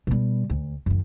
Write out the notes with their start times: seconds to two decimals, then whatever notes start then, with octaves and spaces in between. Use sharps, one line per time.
0.07 B2 G3
0.50 D2
0.86 F#2 D#3